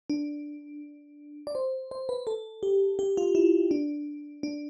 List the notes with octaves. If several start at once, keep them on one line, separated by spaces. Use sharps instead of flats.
D4
D5
C5
C5
B4
A4
G4
G4
F4
E4
D4
D4